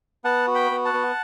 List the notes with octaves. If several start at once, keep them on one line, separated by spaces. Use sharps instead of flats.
B3 F#5 A5
F#4
G5 B5
B3
F#5 A5
B3